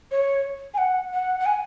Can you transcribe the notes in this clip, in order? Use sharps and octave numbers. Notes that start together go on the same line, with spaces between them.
C#5
G#5
F#5
F#5
F#5
G#5